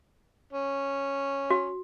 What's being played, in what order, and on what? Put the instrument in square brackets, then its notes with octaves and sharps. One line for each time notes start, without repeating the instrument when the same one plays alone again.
[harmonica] C#4
[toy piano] F#4